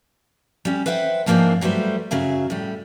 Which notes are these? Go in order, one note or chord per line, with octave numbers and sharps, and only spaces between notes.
G3 C#4
B4 C5 E5 F#5 G5
G#2 F3 A#3 C4 D4 G#4
F#3 G3 A3 B4 C5
F#2 C#3 F#3 G#4 E5
A2 G3